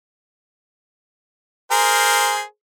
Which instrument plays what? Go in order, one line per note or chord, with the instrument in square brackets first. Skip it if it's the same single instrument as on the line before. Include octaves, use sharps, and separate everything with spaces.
[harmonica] G#4 A#4 C5